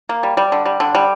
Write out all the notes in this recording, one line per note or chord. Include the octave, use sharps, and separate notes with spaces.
A#3
G3
G3
D3
G3
D3
G3